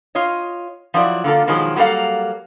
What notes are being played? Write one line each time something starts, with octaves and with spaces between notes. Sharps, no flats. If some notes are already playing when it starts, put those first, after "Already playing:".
F4 C#5 D#5
F3 F#3 E4 D5
D3 A#3 F4 A4
B2 D#3 F3 F#3 G#3
F#3 G3 A#3 A4 F5